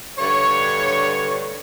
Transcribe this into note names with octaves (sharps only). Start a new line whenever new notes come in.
G2 D3 C#5